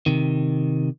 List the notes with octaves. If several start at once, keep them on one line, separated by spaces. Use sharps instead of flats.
C3 D#3